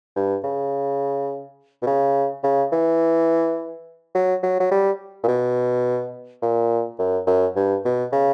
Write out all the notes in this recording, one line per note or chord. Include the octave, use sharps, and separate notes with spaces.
G2
C#3
B2
C#3
C#3
E3
F#3
F#3
F#3
G3
A#2
B2
A#2
F#2
F#2
G2
B2
C#3